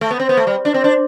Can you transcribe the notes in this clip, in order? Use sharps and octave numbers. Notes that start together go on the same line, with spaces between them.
A3
B3
C4
B3
A3
G3
D4
C4
D4